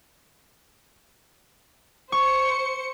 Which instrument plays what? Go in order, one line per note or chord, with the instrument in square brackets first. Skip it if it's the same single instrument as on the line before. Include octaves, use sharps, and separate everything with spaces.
[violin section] C5 C#7 [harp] C#6